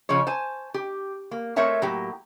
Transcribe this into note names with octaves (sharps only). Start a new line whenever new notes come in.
C#3 F3 C#4 C#5
C5 G#5 A5
G4
A#3
A3 C4 A#4 C#5 E5 A5
A2 F#3 A#3 G4